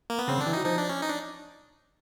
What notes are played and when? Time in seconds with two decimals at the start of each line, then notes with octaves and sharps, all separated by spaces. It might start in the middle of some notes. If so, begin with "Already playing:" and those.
0.10 A#3
0.18 B3
0.28 C#3 C4
0.37 D3
0.41 D4
0.46 E3
0.53 F#3 D#4
0.65 F3 D#4
0.77 D4
0.89 C#4
1.02 D#4
1.10 D4